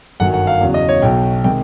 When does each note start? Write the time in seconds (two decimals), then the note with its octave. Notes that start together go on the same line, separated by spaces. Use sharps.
0.20 G1 F#2 D#3 F#3 F#5
0.34 F#5
0.47 F5
0.61 E2 C#3 F#3
0.74 D#5
0.89 C#5
1.02 B1 B2 F#3 G5
1.44 C3 D#3 G#3 G5